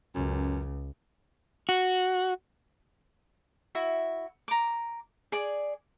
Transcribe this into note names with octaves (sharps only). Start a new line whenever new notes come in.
C#2 F#2
F#4
E4 F#4 E5
A#5 D6
G#4 D5